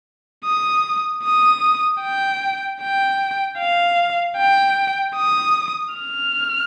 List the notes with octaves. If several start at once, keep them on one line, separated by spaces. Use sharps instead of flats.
D#6
D#6
G5
G5
F5
G5
D#6
F6